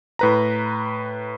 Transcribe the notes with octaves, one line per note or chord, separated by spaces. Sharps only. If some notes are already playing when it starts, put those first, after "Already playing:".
A2 B4 A#5